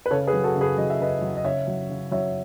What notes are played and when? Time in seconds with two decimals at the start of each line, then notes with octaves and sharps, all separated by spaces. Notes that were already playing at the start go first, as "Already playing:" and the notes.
0.06 B4
0.11 C#3 A4 C#5
0.27 G#4 B4
0.33 F#3
0.44 F#4 A4
0.55 C#3
0.61 G#4 B4
0.78 F#3 D#5
0.90 E5
1.00 C#3 B4 D#5
1.22 F#3
1.37 D#5
1.44 C#3 C#5 E5
1.67 F#3
1.89 C#3
2.11 F#3 C#5 E5